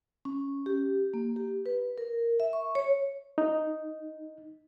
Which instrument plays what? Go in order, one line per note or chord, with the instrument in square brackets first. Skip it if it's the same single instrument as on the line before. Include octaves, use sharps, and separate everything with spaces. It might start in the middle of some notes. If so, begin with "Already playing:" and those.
[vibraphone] C#4
G4
A#3
G4
B4
A#4
E5
C#6
C#5
[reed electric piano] D#4